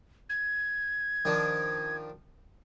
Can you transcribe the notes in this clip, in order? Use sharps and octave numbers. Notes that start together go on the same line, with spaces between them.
G#6
D#3 F3 D4